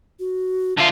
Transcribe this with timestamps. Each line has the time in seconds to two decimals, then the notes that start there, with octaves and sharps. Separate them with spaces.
0.19 F#4
0.78 D3 F4 E5